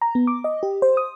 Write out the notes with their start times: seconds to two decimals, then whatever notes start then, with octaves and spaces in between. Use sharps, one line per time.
0.02 A#5
0.15 B3
0.27 D6
0.44 D#5
0.63 G4
0.82 C5
0.97 D#6